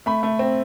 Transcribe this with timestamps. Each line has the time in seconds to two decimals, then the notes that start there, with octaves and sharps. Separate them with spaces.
0.06 A3 B5
0.23 A3
0.39 C4